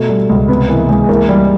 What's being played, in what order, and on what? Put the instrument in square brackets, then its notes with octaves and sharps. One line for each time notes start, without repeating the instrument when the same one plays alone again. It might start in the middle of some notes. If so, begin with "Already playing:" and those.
Already playing: [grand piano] B2 A3 A4
G3
C#2
C3 B3 B4
E3 A#3 A#4
C#2 G#3 G#4
E3 A#3 A#4
G3